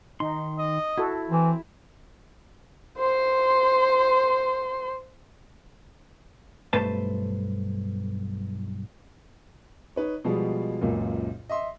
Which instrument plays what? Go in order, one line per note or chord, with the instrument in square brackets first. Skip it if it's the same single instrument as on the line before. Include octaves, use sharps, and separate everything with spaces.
[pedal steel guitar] D#3 C6 [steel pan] D#4
[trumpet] D#5
[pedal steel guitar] E4 [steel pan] F#4 A4
[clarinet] E3 [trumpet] C4
[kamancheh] C5 C6
[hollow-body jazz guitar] B1 G2 A3 B4 C5 A5
[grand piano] D#4 B4 C#5
B2 F3 G3 G#3
C#2 F#2 A#2
D#5 E5 C6